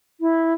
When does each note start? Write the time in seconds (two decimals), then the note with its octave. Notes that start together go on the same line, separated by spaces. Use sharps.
0.21 E4